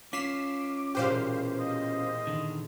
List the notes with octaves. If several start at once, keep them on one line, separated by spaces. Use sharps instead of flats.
C#4 F4 D6 B6 C7 E7
E1 A#2 G4 B4 C5 F5
D#5
D3 D#3